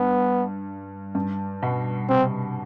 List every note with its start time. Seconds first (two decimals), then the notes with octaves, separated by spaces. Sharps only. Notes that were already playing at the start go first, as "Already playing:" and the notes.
Already playing: G2 B3
1.15 G2
1.63 B2
2.09 C3 C4